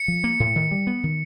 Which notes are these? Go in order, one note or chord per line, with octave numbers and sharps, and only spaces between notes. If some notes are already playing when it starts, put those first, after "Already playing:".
Already playing: C#7
F3
A#3
A2
D#3
G3
B3
D#3